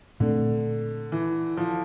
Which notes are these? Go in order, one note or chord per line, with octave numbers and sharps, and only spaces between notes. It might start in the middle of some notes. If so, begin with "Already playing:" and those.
A#2 D3 A3 C4
E3
F3